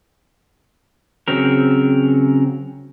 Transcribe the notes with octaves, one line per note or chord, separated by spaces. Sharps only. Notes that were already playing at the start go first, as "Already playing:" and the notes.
C#3 F#3 C4 A#4